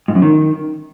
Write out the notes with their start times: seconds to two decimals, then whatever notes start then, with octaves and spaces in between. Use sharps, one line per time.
0.08 G#2
0.15 F#2
0.22 D#3